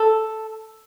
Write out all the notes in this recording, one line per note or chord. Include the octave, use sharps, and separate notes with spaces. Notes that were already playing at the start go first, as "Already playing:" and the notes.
Already playing: A4